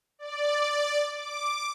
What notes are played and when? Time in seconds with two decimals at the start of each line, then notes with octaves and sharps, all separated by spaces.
0.19 D5
1.11 D6